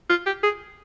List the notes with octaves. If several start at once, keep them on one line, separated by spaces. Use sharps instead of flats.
F4
G4
G#4